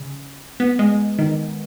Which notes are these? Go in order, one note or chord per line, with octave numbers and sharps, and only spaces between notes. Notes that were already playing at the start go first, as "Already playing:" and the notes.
Already playing: C#3
B3
G#3
D#3